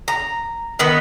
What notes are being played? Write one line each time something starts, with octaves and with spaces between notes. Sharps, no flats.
A#5
D#3 B3